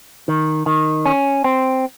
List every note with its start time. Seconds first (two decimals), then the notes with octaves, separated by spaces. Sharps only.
0.28 D#3
0.66 D#3
1.05 C#4
1.44 C4